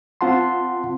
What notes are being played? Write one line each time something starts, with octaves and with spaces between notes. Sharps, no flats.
C4 F4 F#5 A5 C6